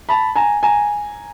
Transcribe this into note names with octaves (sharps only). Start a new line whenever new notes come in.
A5 B5
G#5 A#5
G#5 A#5